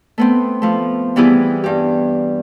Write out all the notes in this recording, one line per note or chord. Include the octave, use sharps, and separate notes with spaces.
A3 B3 C4
F3 A3
E3 G3 B3 E4 G4 G#4
G2 G4